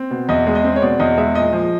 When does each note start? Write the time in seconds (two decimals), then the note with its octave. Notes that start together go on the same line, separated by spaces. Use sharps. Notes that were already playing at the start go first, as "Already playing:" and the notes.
Already playing: C4
0.11 B2
0.29 E2 D#5
0.47 G#3
0.55 D#5
0.64 C4
0.76 C#5
0.82 B2 D5
1.00 E2 D#5
1.18 G#3 E5
1.35 A#2 D#5
1.53 F3